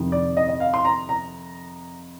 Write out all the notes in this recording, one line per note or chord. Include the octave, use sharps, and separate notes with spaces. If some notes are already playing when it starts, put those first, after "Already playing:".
Already playing: F2 C3 D#3
D5
D#5
D#5
F5
C6
A#5
A#5